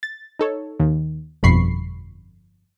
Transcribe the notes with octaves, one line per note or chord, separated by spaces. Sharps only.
A6
D#4 A4 C#5
D#2
G1 F2 B2 B5 C#6 C7